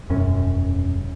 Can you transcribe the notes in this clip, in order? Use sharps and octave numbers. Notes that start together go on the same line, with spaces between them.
E1 F#2 C#4